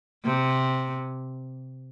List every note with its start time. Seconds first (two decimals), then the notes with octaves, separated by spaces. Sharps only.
0.24 C3